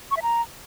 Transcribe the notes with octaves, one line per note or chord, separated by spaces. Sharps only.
C#6
E5
A#5